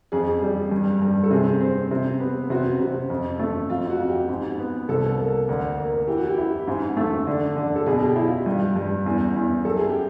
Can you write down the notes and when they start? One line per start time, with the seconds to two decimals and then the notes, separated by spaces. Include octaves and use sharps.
0.12 F2 G#4
0.42 G3
0.71 G2
1.02 G2
1.23 A4
1.31 C3 G#4
1.61 C4
1.91 C3
2.20 B3
2.50 C3 F#4
2.80 C3
3.10 F2
3.39 A3
3.70 F2 F4
3.90 F#4
4.00 F2
4.09 G4
4.29 G#2
4.59 B3
4.89 C2 A4
5.19 A#3
5.49 D2
5.78 A#3
6.07 E3 G4
6.18 F#4
6.28 G4
6.38 E4
6.68 G#2
6.97 A3
7.27 D3
7.57 D3
7.76 A4
7.86 B2 G#4
8.06 G4
8.16 E4
8.26 F4
8.46 G2 G4
8.76 G2
9.06 E2
9.36 E2
9.65 F#2 A4
9.77 G#4
9.89 G4